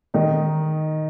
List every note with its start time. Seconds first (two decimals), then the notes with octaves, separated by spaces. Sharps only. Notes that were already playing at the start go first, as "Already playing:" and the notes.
0.14 D#3 D#4